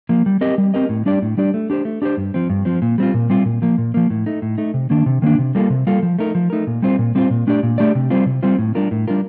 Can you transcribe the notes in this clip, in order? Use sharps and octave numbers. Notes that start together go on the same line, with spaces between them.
F3 A#3
G3
C4 G4 A#4 D#5
G3
C4 G4 A#4 D#5
A2
G3 D4 G4 D5
A2
G3 D4 G4 D5
A3
D4 G4 C5
A3
D4 G4 C5
G2
F3 C4
G2
F3 C4
A#2
G3 C4 F4
A#2
G3 C4 F4
A#2
F3 A#3
A#2
F3 A#3
A2
A3 D#4
A2
A3 D#4
C3
D#3 A#3 D4
C3
D#3 A#3 D4
C3
G3 A#3 F4 A4
C3
G3 A#3 F4 A4
F3
A3 D#4 A#4
F3
A3 D#4 A#4
A#2
G3 C4 F4 C5
A#2
G3 C4 F4 C5
A#2
A3 D4 G4 D5
A#2
A3 D4 G4 D5
C3
G3 C4 F4 C5
C3
G3 C4 F4 C5
A2
G3 D4 F4 A#4
A2
G3 D4 F4 A#4